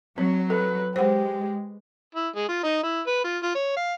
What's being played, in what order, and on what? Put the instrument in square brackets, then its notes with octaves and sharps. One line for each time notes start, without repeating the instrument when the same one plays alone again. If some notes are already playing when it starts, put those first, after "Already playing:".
[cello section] F#3 [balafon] C4 [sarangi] C#5
[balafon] A4 [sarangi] B4
[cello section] G#3 [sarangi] G4 [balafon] C5 F#5
[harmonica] E4
G#3
F4
D#4
E4
B4
F4
F4
C#5
F5